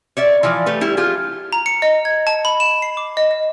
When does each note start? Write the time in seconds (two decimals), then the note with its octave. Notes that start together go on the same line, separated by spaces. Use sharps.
0.17 C#5 D5 E5
0.43 E3 F3 D5
0.66 A3 G4 B4
0.81 G3 E4 G4
0.97 F4 G4 G#4
1.53 A#5
1.66 C#7
1.82 D#5
2.05 G#6
2.27 A5
2.45 B5
2.60 E7
2.82 C7
2.97 D6
3.17 D#5
3.31 D#5